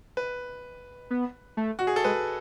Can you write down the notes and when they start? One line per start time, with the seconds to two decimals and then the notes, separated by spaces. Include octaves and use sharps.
0.17 B4
1.10 B3
1.57 A3
1.79 F#4
1.87 G#4
1.96 A4
2.04 G#3 B4